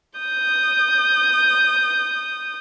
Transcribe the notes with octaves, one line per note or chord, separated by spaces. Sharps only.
D#6 G6